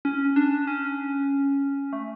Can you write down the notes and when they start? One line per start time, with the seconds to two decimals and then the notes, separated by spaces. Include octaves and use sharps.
0.05 C#4
0.36 D4
0.67 C#4
1.93 A3